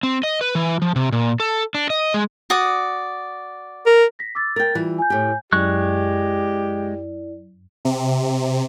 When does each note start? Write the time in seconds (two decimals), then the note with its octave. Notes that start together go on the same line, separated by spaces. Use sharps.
0.03 C4
0.23 D#5
0.41 B4
0.55 E3
0.82 F3
0.96 C3
1.12 A#2
1.40 A4
1.74 D4
1.90 D#5
2.14 G#3
2.50 F#4 D5 D#6
3.86 A#4
4.19 A#6 B6
4.35 D6 E6 A6
4.56 A#4 G5 A6
4.75 E3 G3 F4
4.98 G#5 G6
5.10 A2 G4
5.53 F#2 G#3 E4 G4 D5 C#6 F#6
7.85 C3